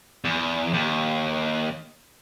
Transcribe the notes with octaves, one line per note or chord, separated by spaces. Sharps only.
E2
D#2